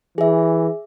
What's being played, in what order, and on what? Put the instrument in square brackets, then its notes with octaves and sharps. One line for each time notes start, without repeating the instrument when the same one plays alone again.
[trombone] E3 [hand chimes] G#4 E5